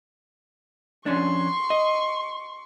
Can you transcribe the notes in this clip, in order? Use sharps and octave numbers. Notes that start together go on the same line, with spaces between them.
F2 C#4 D4 C6 C#6
D#5